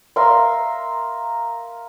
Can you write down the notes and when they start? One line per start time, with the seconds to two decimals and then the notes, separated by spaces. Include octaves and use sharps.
0.16 A#4 E5 F5 C6